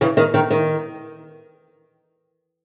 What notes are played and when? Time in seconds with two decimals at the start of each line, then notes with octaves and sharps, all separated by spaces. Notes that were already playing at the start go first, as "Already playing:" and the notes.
0.01 C#3 E3
0.17 D#3
0.34 D#3
0.50 D#3